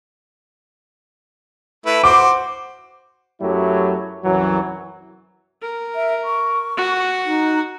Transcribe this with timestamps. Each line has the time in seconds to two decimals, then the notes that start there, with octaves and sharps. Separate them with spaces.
1.86 A3 E4 B4
2.04 F#4 C5 D6
3.41 F#2 F#3 A3 E4 G4
4.24 C2 F#2 E3 F#3
5.62 A#4
5.95 E5
6.24 C#6
6.77 F#4 F#5
7.25 D#4